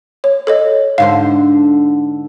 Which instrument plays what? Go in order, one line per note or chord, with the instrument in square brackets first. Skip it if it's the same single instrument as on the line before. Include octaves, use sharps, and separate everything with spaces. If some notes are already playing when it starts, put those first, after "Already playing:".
[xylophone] C#5
A4 C#5 D#5
[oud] G#2 D3 C5 [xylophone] F5